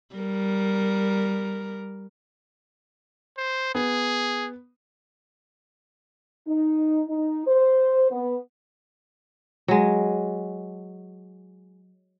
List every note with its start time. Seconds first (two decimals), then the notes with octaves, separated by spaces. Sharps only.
0.15 G3 A#4
3.38 C5
3.75 B3 G#4
6.48 D#4
7.08 D#4
7.47 C5
8.10 B3
9.68 F#3 G#3